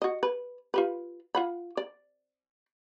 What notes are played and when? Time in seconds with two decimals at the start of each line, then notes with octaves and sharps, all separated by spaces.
0.02 F#4 D#5
0.23 B4
0.74 F4 G4 B4
1.35 F4 F#5 B5
1.77 D5